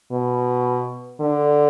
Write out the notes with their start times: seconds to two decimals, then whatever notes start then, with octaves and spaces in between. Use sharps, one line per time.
0.11 B2
1.21 D3